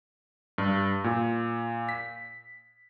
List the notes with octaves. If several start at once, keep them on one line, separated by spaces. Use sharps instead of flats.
G2
A#2
B6